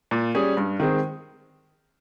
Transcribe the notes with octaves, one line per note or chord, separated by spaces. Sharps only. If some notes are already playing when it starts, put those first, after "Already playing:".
A#2
G3 C#4 G#4
G2
D#3 G#3 C4